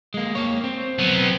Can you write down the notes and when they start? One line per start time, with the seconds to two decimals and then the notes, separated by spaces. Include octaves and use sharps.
0.14 G#3 A#3
0.35 A#3 C#5
0.64 C4
0.99 F#3 B3